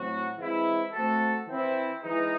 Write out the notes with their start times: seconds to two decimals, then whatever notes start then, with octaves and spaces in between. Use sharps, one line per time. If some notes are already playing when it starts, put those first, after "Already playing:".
Already playing: A2 F#3 C4 F#4
0.38 E3 G#3 C4 E4
0.93 A3 C4 F#4 A4
1.47 E3 C4 E4
2.02 E3 G#3 D#4